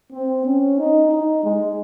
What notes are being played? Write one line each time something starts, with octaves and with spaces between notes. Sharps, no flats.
C4
C#4
D#4
D#4
G#3